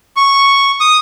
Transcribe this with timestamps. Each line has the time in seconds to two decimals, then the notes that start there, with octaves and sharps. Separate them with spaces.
0.17 C#6
0.80 D#6